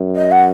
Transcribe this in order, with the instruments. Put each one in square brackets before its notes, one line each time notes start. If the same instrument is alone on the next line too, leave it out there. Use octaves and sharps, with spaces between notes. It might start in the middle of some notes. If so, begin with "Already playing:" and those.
Already playing: [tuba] F#2
[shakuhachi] D#5
F#5